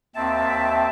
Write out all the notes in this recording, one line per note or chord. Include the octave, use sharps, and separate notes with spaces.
D#2 C4 E5 A5